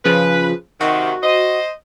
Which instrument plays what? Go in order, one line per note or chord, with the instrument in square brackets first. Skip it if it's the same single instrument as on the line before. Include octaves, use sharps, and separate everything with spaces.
[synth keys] C#3 F3 [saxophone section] B4
[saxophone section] C3 D#3 [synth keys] F#4
[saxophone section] C5 D#5